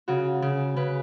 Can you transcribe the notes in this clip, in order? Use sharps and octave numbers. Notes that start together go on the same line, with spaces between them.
C#3 F#4
C#3
C#3 B4